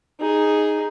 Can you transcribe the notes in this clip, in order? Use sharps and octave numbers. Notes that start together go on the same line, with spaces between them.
D#4 G#4